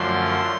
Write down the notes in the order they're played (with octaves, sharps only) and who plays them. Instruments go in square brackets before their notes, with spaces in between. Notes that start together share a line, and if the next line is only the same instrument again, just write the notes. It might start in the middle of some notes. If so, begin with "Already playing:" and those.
Already playing: [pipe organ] F#2 D3 F3 A3 C6